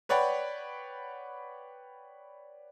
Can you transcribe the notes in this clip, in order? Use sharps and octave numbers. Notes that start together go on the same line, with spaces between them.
B4 C#5 D5 F#5 G5 B5